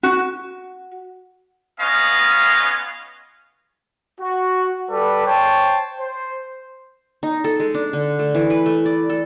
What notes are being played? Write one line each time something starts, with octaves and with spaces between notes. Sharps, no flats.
F#4
B3 C#4 F4 D#5 F5 G#5
F#4
G3 A4 B4 D5
C5 C#5 G5 A5
C5
D#4
A4
G#3
D4
D3
A3
E3
B4
A3
D5
A4